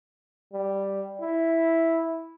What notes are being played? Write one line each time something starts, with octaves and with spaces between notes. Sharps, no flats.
G3
E4